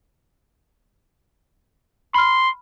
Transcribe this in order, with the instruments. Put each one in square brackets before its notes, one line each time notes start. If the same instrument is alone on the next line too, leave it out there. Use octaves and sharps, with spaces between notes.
[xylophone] B5 F6 [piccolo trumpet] C6